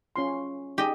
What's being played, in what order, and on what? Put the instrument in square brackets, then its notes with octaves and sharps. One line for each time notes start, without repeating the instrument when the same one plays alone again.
[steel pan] C#4 F4 C6
[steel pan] D#4 G#4 [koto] G4 D#5